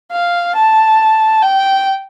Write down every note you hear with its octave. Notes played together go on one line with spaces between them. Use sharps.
F5
A5
G5